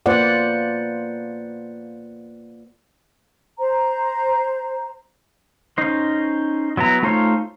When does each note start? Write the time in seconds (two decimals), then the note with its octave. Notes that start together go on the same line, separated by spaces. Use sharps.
0.06 A#3 F4 B4 C5 D5 F#5
3.58 C5 A#5
5.78 C#4 D#4 C5
6.77 F#3 B3 E4 A#5
7.03 A3 D#4 F4 C5 C#5